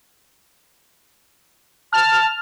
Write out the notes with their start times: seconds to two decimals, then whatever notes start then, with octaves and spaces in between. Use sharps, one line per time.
1.93 A5 F6